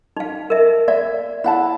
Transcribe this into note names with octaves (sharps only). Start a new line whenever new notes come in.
D#4 F5
A#4 E5
D5 E5
E4 F#5 A5